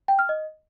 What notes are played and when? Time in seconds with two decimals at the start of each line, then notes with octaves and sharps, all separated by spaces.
0.08 G5
0.19 F6
0.29 D#5